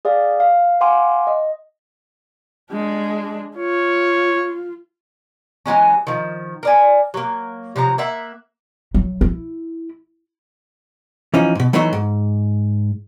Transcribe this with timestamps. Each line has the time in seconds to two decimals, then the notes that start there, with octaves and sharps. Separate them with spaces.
0.05 G#4 D5 F5
0.40 F5
0.81 F5 F#5 G#5 C6 D6
1.27 D#5
2.72 G#3 D4
3.57 F4 C#5
5.66 E3 F#3 G#3 C#4
6.07 D#3 F3
6.63 A#4 D5 G#5
7.14 F#3 A#3
7.76 C3 F3 F#3 A#5
7.98 A#3 E5 F#5
8.94 F#3
9.21 E4
11.34 E3 F3 C#4 D#4
11.55 G#2 B2
11.73 E3 F#3 A3 B3 D#4 F#4
11.93 G#2